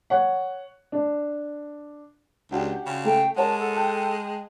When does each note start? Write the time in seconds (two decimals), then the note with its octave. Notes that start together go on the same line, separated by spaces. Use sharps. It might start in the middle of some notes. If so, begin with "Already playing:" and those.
0.10 C#5 F#5
0.92 D4
2.51 C#2 D4 F#4 G4
2.86 C#3
3.04 A3 G5
3.36 G#3 A#4 C#5 F#5 A5
3.59 A4
3.76 G5 A5 F#6